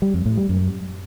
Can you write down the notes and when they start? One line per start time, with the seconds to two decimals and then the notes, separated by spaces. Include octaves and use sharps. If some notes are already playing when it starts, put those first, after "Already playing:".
0.02 G3
0.14 F2
0.26 A2
0.37 G3
0.49 F#2